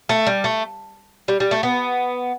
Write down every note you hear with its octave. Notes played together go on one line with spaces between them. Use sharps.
A3
G3
A3
G3
G3
A3
B3